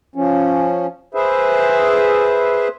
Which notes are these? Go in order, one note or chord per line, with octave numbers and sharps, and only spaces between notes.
F3 C#4
G#4 B4 C5 E5